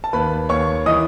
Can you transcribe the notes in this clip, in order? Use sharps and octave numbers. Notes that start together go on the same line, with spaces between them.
A5
D#2 B4 B5
D#2 C#5 C#6
E3 D#5 D#6